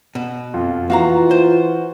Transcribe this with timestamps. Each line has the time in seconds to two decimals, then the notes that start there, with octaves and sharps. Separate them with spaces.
0.15 B2
0.54 F2 F4
0.90 E3 A#3 F#4 F5 A#5
1.31 C5